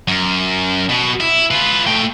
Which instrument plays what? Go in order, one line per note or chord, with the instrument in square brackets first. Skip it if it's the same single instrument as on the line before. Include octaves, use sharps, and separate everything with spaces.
[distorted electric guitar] F#2
B2
E4
F4 B4
A3 G5